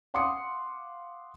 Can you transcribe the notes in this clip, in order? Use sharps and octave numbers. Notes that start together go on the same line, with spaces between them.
F5 F#5 C6 D6 D#6 C#7